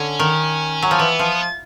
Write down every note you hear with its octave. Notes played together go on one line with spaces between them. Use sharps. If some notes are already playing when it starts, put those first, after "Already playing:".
Already playing: D3 C#4
D#3
F#3
F3
E3 B3
F3